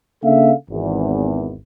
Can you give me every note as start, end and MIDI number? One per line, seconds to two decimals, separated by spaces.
0.24 0.52 49
0.24 0.52 58
0.24 0.52 62
0.24 0.52 69
0.24 0.52 76
0.24 0.52 77
0.70 1.57 32
0.70 1.57 40